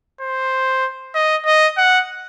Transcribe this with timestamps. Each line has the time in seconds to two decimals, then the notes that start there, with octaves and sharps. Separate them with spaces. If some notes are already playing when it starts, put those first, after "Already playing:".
0.21 C5
1.14 D#5
1.46 D#5
1.77 F#5